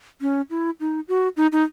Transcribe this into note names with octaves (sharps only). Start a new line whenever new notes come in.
C#4
E4
D#4
F#4
D#4
D#4